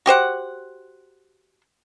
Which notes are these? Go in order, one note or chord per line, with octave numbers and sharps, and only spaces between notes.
F#4 G4 C5 F#5